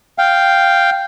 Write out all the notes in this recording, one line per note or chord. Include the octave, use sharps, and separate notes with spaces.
F5 G5